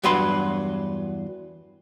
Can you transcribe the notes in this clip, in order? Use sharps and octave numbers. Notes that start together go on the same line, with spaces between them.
E2 G2 F#3 B4 C6